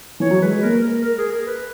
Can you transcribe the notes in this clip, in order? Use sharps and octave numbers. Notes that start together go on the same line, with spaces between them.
E3 C#5
F#3
G#3 B4
G#3
A#3 A#4
A#4
A#4
G#4
A#4
B4